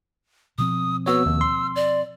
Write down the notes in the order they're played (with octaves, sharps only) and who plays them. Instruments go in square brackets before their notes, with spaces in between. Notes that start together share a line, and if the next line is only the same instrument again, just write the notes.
[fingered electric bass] B2 F3 C4 [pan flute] D#6
[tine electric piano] B3 F#4 C#5 [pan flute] E6
[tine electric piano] D#2
C6
[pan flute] D5